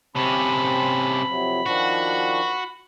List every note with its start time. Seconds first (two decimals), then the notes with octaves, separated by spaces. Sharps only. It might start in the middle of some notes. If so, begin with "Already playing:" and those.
0.16 C3 C4 C#4 A5 B5
1.28 F2 C3 F#3
1.66 D#3 F3 D4 F#4